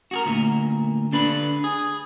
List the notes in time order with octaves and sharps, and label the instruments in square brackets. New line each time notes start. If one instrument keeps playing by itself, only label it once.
[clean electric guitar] F#4 G#4 A#4
D2 A#2
D3 D4 B4
G#4